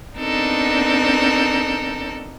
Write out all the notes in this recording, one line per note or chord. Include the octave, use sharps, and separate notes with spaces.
B3 C4 D4 D#4 A4 A#4